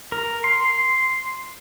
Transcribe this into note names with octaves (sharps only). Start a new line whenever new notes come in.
A#4
C6